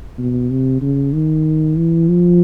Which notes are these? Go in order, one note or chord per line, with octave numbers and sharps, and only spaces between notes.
B2
C3
C#3
D#3
E3
F3